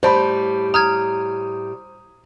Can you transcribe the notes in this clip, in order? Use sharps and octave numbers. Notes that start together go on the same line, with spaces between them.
A2 G3 C5 D5 A5 B5
A#5 D#6 F6 G#6